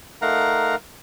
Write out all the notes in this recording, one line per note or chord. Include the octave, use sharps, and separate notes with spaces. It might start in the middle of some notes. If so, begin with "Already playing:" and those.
A3 D#4 A#4 F5 F#5 A#5